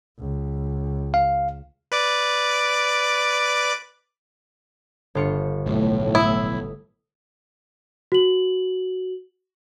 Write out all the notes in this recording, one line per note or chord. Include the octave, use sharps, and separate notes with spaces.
C#2
F5
B4 D5 D6
G1 F4 C#7
B1 A2
E4 D#6 E6
F#4 F#7